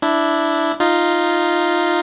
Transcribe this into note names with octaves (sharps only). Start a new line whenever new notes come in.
D4 E4
D#4 F4